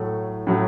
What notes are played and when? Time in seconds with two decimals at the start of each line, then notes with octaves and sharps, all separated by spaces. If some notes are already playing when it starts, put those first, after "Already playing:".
Already playing: A2 F#3 A3
0.47 A2 F#3 A3